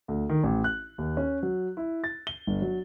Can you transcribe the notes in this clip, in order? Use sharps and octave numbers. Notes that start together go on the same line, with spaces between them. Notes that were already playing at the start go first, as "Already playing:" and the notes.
D2
D#3
A1
F#6
D#2
C#4
F#3
E4
A6
G7
G1
F#3